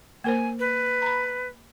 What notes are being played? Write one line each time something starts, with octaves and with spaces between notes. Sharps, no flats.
A#3 A#4 C5 G#5
B4
A#5 B5